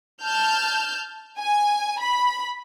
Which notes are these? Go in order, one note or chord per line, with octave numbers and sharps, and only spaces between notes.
A5 F6 G6
G#5
B5